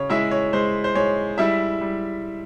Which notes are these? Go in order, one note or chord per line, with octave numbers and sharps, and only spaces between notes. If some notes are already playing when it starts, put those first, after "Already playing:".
Already playing: C#3 C#5
G#3 E4 E5
C#5
G#3 C5
C5
G#3 C#5
G3 E4 E5
G3